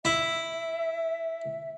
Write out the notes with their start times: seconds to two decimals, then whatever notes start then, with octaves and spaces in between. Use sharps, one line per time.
0.05 E4 E5